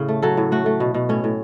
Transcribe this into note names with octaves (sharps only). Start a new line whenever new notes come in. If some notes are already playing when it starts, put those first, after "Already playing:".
Already playing: A2 C#3
A3
F#3 A4
A2
A3 F#4
A3
B2
B2
A2 C#4
A2